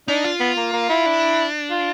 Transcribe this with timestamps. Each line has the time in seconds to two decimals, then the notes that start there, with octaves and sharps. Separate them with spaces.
0.08 D4 D#4
0.24 F4
0.40 B3
0.57 A#3
0.73 A#3
0.89 E4
1.06 D4
1.71 F4